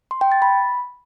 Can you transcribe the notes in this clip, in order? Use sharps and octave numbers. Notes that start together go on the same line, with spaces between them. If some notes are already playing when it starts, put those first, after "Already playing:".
C6
G5
A6
B5